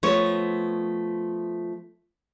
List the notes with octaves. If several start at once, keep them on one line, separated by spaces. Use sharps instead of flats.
F3 A3 B3 C#5